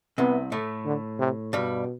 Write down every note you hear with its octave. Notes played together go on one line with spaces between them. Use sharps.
C2 C3 B3
A2 A3
D3
C3
G2 B2 G3